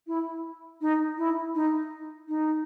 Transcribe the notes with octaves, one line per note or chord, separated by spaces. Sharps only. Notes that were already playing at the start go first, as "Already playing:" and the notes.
E4
D#4
E4
D#4
D#4